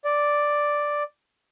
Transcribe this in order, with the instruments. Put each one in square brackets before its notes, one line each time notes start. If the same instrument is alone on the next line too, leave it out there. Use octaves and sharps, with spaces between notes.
[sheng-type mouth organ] D5